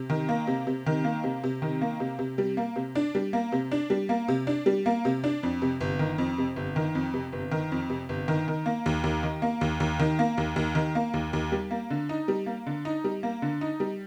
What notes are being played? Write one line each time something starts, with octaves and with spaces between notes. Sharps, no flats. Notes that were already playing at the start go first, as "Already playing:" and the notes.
Already playing: C3
D#3
A#3
C3
C3
D#3
A#3
C3
C3
D#3
A#3
C3
C3
G3
A#3
C3
D4
G3
A#3
C3
D4
G3
A#3
C3
D4
G3
A#3
C3
D4
F2
C3
G1
D#3
F2
C3
G1
D#3
F2
C3
G1
D#3
F2
C3
G1
D#3
D#3
A#3
D#2
D#2
D#3
A#3
D#2
D#2
D#3
A#3
D#2
D#2
D#3
A#3
D#2
D#2
G3
A#3
D3
D#4
G3
A#3
D3
D#4
G3
A#3
D3
D#4
G3